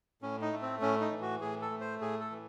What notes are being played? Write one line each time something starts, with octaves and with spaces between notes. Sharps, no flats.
A2 C#4
D#4
A3
C4
A2 C#4
D#4
E3
F#4
A2 G#4
A4
A3
C5
A2 G#4
A4
E3